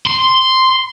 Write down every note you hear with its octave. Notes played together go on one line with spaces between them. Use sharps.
C6